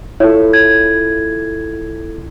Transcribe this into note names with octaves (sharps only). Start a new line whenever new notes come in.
E4 F4 A4 C#5
G#6